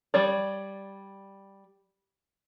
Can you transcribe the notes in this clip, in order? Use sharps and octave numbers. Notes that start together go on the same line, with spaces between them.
G3 C#5 D5